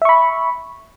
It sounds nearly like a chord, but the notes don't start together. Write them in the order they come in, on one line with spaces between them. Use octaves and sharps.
E5 C#6 B5